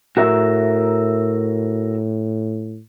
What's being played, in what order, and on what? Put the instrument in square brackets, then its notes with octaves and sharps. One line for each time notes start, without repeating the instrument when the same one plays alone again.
[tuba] A2 [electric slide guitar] F#4 A#4 E5